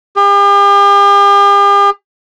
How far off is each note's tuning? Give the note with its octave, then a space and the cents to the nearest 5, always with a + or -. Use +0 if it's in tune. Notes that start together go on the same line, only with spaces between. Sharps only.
G4 +45